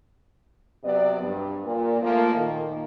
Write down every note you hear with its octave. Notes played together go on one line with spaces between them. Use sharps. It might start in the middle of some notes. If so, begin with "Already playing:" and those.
C3 F#3 B3 D5
G2
A#2
F3 A3 A#3
A#2 D#3